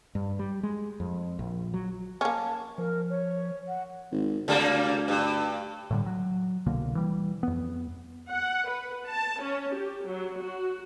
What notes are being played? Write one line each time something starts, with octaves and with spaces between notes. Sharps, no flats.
G2
G3
G#3
F2
A#1
F#3
A#3 C#4 A5
F3 A#4
C#5
F#5
G#1
D2 C#3 G3 A#3
G2
A2 D3 G3
F#3
C2 B2 D3 A#3
E3 G3
F2 B3
F#5
B4
A5
C#4
G4
F#3
F#4